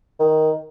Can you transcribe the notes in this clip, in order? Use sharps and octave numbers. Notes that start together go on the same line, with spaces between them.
D#3